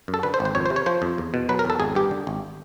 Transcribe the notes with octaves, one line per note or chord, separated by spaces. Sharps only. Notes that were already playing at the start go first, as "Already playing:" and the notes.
F#2
A4
D3 B4
C5
G#1
C5
F2 C#5
C5
C3
C#5
F3 C5
F2
E2
B2
F#3 B4
A#4
E2 A4
G#1 G#4
G2 G4
D3
G#1